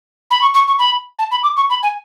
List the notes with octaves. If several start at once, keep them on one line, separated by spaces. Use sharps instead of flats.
B5
C#6
C#6
C#6
B5
A5
B5
D6
C#6
B5
G#5